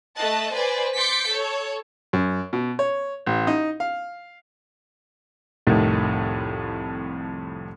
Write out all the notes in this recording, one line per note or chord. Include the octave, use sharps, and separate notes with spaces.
A3 D#5 A5 F#6
B4 C5 D5 G#5
C6 D6 G6 A6 B6 C#7
A4 C#5
F#2
B2
C#5
A1
D#4
F5
C2 F2 A2 D#3 A3